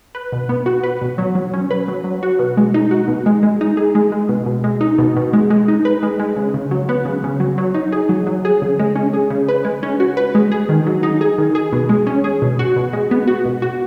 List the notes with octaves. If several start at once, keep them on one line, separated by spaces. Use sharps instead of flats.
B4
B2
B3
F#4
B4
B2
F#3
F#3
C#4
B4
F#3
F#3
F#4
B2
G#3
D#4
F#4
B2
G#3
G#3
D#4
G#4
G#3
G#3
B2
B2
G#3
D#4
B2
B2
G#3
G#3
D#4
B4
G#3
G#3
C#3
C#3
F#3
B3
C#3
C#3
F#3
F#3
D#4
G#4
F#3
F#3
G#4
C#3
G#3
C#4
G#4
C#3
B4
G#3
C#4
F#4
B4
G#3
G#4
D#3
F#3
D#4
G#4
D#3
G#4
B2
G#3
C#4
G#4
B2
F#4
B2
G#3
B3
F#4
B2
F#4